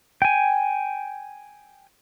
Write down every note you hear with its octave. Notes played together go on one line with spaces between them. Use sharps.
G5 G#5